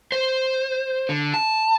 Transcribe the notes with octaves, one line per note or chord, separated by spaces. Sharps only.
C5
D3
A5